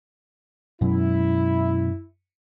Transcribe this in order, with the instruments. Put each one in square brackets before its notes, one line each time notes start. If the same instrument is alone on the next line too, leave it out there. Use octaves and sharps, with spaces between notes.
[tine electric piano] F#2 [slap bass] B2 F#3 G#3 [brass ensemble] E4